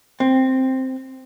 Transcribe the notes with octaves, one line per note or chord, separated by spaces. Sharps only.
C4